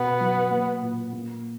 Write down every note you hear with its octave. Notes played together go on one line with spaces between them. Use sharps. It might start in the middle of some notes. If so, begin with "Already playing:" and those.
Already playing: B2 B3 F#4
F#3
A#3
A#2
A#3